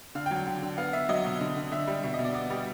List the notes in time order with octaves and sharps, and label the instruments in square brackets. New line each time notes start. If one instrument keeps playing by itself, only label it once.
[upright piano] D3 F5
G5
F#3
G5
D3
D3
B3 F5
B3 E5
F#3 D#5
B2
D3
D3
D3 E5
G3
B2 E5
D#5
B2
D5
B3 D5
G3